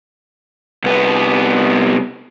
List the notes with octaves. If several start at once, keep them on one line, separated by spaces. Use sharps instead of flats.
C2 B3